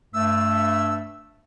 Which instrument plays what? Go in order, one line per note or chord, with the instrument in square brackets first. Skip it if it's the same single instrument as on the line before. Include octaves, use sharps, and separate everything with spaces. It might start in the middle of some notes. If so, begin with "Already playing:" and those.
[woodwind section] G2 A3 [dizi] E6